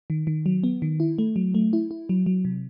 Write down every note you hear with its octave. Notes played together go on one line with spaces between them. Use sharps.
D#3
D#3
F#3
B3
D#3
E4
A3
F#3
A3
E4
E4
F#3
F#3
C3